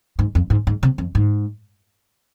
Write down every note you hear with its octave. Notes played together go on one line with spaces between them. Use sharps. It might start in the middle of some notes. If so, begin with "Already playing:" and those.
G#2
F2
G#2
G#2
C3
F2
G#2